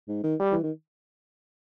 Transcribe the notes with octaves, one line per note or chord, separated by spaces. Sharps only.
G#2
D#3
G3
E3
D#3